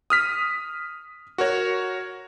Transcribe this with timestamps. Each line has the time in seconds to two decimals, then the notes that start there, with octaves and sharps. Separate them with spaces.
0.10 D#6 F6 B6
1.38 F#4 A#4 C#5